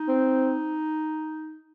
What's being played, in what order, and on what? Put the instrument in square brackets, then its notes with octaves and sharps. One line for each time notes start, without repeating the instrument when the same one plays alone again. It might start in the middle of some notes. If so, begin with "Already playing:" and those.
Already playing: [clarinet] D#4
[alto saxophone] C4